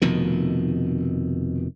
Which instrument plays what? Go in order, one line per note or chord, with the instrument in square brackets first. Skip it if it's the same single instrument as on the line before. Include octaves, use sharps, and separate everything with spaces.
[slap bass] F1 F2 B2 D#3